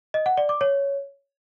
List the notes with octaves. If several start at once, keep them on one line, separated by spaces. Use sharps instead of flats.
D#5
F#5
D5
D6
C#5